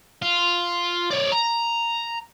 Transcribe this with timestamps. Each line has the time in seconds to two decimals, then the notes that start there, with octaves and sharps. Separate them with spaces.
0.22 F4
1.11 C#5 D5
1.32 A#5